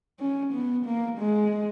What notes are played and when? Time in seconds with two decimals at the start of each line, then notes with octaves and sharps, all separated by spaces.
0.20 C#4
0.53 B3
0.85 A#3
1.18 G#3